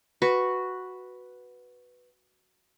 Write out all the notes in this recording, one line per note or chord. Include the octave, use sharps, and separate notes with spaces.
F#4 B4 C#6